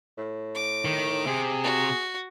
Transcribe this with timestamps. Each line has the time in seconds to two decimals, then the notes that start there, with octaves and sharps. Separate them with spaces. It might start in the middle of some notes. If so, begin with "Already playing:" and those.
0.18 A2
0.55 D6
0.85 D#3
1.27 C3 G#4
1.64 F#4